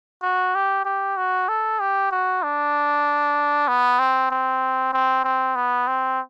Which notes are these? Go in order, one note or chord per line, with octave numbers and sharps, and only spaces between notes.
F#4
G4
G4
F#4
A4
G4
F#4
D4
B3
C4
C4
C4
C4
B3
C4